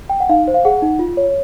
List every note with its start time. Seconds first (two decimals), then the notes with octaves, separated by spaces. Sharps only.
0.10 G5
0.20 F#5
0.29 D#4 F5
0.48 C5
0.54 F5
0.65 G#4 F#5
0.82 D#4
0.99 F4
1.17 C#5